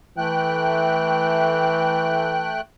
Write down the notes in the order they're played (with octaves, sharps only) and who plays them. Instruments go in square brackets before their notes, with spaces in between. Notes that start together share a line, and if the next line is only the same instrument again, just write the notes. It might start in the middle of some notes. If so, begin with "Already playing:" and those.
[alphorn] E3 [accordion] A3 G5 F#6